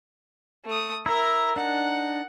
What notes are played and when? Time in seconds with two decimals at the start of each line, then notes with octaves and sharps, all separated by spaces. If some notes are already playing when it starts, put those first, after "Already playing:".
0.66 A3 D#6
1.06 E4 A#4 E5 A#5
1.56 D4 D#4 F#5